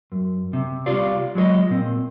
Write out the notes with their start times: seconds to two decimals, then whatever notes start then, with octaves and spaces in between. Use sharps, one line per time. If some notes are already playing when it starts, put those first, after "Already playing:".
0.12 F#2
0.53 C3
0.86 C2 F4 G4 D5 F5
1.35 F#3 G#3 F4 C#5 D#5
1.70 A#2 C4